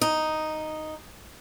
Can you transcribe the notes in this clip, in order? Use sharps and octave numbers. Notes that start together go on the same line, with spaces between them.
D#4